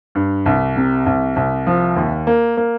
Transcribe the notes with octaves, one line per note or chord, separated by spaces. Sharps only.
G2
C2
C3
C2
C2
F3
D#2
A#3
A#3